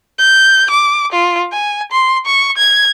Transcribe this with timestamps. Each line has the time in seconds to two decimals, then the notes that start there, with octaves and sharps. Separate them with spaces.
0.19 G6
0.70 D6
1.12 F4
1.52 G#5
1.92 C6
2.26 C#6
2.57 G#6